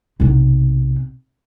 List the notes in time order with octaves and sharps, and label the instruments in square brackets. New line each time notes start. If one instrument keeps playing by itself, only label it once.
[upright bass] B1 C3